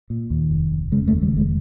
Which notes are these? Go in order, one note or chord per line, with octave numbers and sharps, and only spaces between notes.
A#2
D#2
F1
F1
C#3 G#3
A3
D#2
G3
F1
G#3